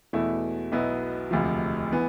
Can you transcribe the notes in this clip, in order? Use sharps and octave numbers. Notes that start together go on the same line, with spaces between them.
E2 B2 A3 E4
B1 B2 B3 E4
E1 D2 C3 F3
E3 B3